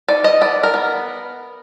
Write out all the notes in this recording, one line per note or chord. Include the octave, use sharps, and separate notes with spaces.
D#4 D5
D#5
B3 D5
A#4
B3